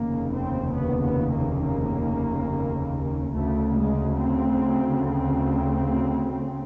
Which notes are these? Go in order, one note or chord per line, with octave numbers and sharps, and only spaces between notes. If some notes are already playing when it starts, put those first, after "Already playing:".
Already playing: F1 D#2 C#3 A#3
C4
B3
B3
A#3
A#3
D2 C#3 A3
G#3
C4
C4